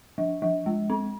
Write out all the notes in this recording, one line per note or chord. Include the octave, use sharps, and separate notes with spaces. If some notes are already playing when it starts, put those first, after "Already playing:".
F3
F3
G#3
C4